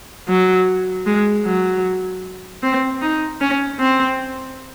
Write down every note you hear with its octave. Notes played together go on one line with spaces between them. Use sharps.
F#3
G#3
F#3
C4
D#4
C#4
C4